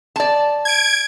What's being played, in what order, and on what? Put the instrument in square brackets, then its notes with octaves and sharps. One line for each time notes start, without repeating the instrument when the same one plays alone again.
[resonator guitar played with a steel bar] D5 A5
[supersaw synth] G#6 D7